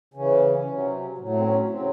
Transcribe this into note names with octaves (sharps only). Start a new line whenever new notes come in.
C#3 E3 C#4
C3 F#3
A2 F#3
A3
C4
C#4
C#3 F#3 C4